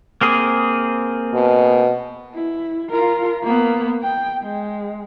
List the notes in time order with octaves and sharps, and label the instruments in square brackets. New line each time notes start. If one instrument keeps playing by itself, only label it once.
[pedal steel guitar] A#3 C4 G#4
[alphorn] B2
[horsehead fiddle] E4
F4 A#4
A#3 B3
G5
G#3